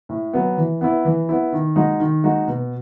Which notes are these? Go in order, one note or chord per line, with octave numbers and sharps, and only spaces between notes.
A2
F#3 B3
E3
B3 E4
E3
B3 E4
D#3
G#3 D#4 F#4
D#3
G#3 D#4 F#4
B2